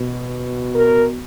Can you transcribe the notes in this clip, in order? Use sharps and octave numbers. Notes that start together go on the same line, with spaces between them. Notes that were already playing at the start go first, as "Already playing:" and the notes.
Already playing: B2
A#4